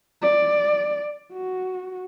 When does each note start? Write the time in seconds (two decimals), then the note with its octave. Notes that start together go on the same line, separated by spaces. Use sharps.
0.22 D5
1.33 F#4